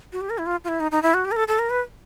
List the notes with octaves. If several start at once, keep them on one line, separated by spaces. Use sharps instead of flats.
F#4
G4
A#4
E4
F4
F4
E4
D#4
D#4
E4
F#4
G4
A#4
A4
A4
A#4
B4